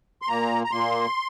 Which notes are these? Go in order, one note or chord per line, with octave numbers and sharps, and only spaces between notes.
C6
A#2 A#3 A#5
A#5
A#2 A#3 C6